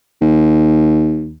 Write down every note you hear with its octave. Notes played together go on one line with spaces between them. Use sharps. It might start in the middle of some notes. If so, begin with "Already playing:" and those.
D#2